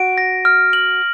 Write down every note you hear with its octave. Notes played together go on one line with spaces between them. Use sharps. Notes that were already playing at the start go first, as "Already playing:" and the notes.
Already playing: F#4 D7
A#6
F6
F#7